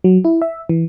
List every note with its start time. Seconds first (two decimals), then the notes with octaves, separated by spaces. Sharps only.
0.04 F#3
0.25 E4
0.42 E5
0.69 E3